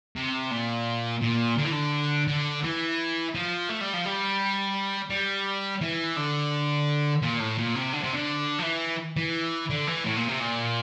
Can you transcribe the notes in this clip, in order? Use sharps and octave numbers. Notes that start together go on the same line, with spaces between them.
C3
A#2
A#2
D3
E3
D3
D3
E3
F3
A3
G3
F3
G3
G3
E3
D3
A#2
A2
A#2
C3
D3
C3
D3
F3
E3
E3
D3
E3
A2
A#2
C3
A#2